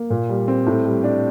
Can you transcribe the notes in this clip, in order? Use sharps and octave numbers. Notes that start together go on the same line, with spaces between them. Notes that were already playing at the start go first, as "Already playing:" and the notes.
Already playing: A#3
A#2
G3
C4
A2
G3
D4